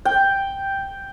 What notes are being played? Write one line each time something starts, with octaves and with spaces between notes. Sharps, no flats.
G5